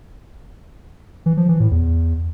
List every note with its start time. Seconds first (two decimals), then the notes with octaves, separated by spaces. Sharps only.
1.26 E3
1.37 F3
1.49 E3
1.60 A2
1.71 E2